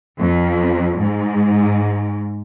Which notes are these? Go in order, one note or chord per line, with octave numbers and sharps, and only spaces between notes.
F2
G#2